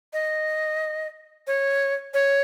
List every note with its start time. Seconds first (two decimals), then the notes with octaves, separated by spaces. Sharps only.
0.13 D#5
1.47 C#5
2.14 C#5